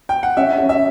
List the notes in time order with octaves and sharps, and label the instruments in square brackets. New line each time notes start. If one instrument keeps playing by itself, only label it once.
[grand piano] G5
F#5
[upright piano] C#4 [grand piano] E5
[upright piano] C#4
[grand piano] E5